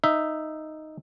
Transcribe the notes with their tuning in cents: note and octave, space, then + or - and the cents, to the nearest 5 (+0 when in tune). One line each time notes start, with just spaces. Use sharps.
D#4 +0 E5 +0